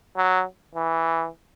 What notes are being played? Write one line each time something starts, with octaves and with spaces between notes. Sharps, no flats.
F#3
E3